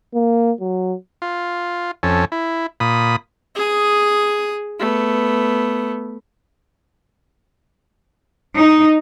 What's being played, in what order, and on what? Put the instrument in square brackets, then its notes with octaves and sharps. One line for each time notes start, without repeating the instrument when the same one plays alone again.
[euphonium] A#3
F#3
[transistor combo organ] F4
F2 C#4 A4
E4
A#2 B5 D#6
[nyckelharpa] G#4 D#6
A3 B3
[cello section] D#4